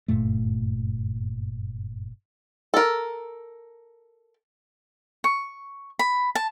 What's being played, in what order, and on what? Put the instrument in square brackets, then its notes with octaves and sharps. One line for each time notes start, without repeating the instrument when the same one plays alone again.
[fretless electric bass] F#1 G2 A#2 A3
[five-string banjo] A4 A#4
[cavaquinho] C#6
B5
A5